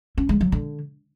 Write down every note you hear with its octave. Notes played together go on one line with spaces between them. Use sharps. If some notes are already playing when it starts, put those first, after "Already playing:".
C#4
G#3
F#3
D3